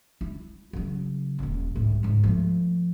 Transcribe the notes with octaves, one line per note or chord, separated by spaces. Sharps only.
E4
C#3 F#3
D#1 C#2
C2 G#2
C#2 G#2
F3 A3